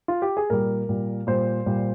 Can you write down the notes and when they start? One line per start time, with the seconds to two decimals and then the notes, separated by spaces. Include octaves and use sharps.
0.08 F4
0.22 G4
0.37 G#4
0.50 A#2 G3 A#4
0.89 A#2 G3
1.27 A#2 G3 C5
1.66 A#2 G3